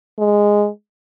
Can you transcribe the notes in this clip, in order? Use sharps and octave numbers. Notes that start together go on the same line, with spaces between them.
G#3